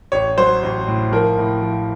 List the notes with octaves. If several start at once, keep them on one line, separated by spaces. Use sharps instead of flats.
A1 C#5
F#3 C5
A1
A2
F3 A#4
A2
F3